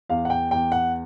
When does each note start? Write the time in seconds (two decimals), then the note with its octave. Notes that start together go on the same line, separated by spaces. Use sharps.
0.09 E2 F5
0.25 F#5
0.30 G5
0.51 E2 G5
0.72 F#5